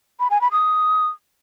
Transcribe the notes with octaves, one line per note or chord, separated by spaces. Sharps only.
B5
G#5
B5
D#6